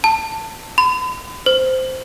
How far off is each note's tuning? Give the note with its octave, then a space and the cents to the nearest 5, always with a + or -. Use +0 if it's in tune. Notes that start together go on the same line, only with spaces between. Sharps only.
A5 +15
B5 +40
C5 -10